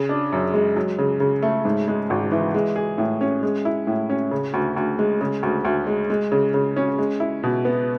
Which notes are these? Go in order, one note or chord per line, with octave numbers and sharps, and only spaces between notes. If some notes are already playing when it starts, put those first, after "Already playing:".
Already playing: C#3
D4
F#2
G#3
F#3
C#3
C#3
A3
G#2
G#3
G#1
E3
G#3
G#4
A2
C#4
G#3
E4
A2
C#4
C#3
D2
D2
G#3
C#3
D2
D2
G#3
G#3
C#3
C#3
C#4
G#3
E4
B2
B3